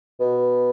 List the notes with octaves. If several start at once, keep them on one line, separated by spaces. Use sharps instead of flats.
B2